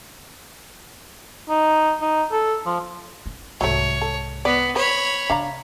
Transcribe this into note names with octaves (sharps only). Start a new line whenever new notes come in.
D#4
D#4
A4
F3
C#4
C2 G#2 F#3 A3 C#5
A4
B3 D5
B4 C#5 B5
C#3 D4 F5 A#5